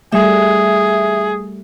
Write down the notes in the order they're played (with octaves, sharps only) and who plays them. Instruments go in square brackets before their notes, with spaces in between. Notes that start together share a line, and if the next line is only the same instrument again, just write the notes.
[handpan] G3 A3 [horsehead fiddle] G#4 [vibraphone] E5